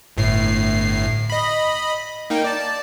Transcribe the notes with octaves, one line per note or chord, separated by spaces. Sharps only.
G1 A2 C7
D#5 B5
A#3 D#4 G5
D5 A5